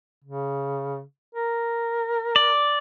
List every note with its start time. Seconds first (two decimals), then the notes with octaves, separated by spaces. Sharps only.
0.24 C#3
1.35 A#4
2.36 D5